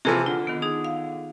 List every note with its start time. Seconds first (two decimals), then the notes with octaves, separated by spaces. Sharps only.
0.05 C3 E3 F3 G#4
0.26 D3 F4
0.47 D#3 B3
0.62 D#4 G#4
0.84 F5